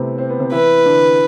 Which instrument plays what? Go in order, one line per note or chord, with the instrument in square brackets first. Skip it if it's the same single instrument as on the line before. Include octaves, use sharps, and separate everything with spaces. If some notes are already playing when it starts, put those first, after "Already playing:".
Already playing: [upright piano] C3 A3 B3 C4 E4
C4
B3
C3 C4
[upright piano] E3 E4 [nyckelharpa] B4
[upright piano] D3 D4